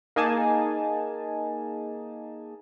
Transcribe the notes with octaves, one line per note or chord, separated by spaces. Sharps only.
A#3 D#4 G#4 G#5 A5